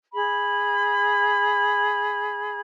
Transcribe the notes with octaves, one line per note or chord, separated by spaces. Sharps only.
G#4 B5